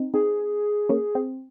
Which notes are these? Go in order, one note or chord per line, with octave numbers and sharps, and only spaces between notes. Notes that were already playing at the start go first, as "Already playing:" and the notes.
Already playing: C4 D#4
C4 D#4 G#4
A#3 C#4
C4